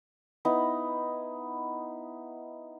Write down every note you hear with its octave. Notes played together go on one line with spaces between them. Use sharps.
B3 D#4 E4